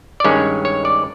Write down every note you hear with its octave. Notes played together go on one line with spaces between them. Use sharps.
D5
G2 D#3 G#3 C#4 C#5
C#5
D5